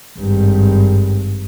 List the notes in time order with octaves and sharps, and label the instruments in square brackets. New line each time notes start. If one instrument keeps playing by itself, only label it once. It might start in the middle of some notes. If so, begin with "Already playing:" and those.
[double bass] G#1 G2